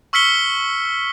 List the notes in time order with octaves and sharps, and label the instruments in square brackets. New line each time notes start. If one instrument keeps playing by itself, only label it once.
[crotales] C#6 E6 F6 B6 C#7 G7